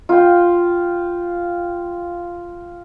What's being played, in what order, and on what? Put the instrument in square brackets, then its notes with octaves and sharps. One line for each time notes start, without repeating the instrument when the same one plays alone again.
[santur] F4 G5